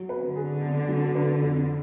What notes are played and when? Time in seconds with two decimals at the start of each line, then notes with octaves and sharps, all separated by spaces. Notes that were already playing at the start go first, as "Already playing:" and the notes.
Already playing: F#3
0.09 B4
0.22 D3
0.36 G#4
0.61 D4
0.88 F#3
1.15 B4
1.41 F2